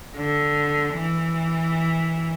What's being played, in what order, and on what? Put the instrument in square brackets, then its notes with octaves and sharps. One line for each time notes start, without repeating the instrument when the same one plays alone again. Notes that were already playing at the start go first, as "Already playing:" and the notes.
[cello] D3
E3